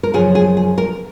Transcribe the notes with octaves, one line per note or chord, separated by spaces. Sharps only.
A#4
F#2 C#3 F3 G#4
G#4
G#4
A#4